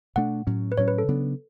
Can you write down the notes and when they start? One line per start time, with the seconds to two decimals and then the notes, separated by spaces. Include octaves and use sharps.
0.16 B2 A3 D4 F#5
0.47 A2 F#3 C#4
0.72 B4
0.78 A2 F#3 C#4 C#5
0.88 B4
0.98 A4
1.08 C#3 F#3 B3 D4